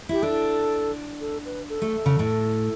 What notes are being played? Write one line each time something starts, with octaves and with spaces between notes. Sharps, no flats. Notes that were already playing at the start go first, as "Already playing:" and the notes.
E4 G4
D4 A4
A4
B4
A4
A3
C#3
A2